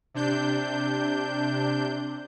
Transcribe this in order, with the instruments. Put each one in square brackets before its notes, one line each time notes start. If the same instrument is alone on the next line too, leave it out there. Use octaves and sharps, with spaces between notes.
[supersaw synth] C3 D4 G6